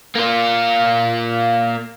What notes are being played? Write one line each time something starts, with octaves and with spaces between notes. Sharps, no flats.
A#3 F4